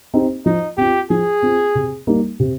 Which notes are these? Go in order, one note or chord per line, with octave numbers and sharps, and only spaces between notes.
C4 D#4 G4
F3 D#4
C4 F4 G4
F3 G#4
C4 F4
C3
G3 A#3 D#4
C3